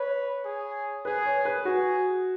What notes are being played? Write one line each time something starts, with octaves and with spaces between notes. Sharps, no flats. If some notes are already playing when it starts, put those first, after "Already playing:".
Already playing: B4 C#5
G#4
G#4 B4
C#5
B4
F#4 G#4